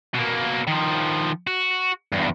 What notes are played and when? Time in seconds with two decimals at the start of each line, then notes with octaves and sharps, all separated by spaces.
0.14 B2 A#3
0.67 D#3 F3
1.47 F#4
2.12 E2 G2